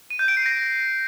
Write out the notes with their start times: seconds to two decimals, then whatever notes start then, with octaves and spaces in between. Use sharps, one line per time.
0.10 D#7
0.19 G6
0.28 D7
0.37 C7
0.46 A#6